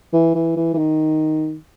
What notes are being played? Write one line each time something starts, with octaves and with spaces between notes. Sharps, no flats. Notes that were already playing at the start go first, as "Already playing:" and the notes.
E3
E3
E3
E3
D#3